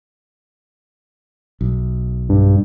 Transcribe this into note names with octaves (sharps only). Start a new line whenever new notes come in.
B1
G2